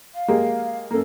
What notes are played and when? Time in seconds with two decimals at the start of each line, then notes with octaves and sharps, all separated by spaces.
0.15 F5
0.28 G#3 A#3 G4
0.91 F#2 A#3 A4